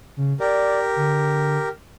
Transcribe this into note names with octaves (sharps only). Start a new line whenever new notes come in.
C#3
G4 A#4 D5
D3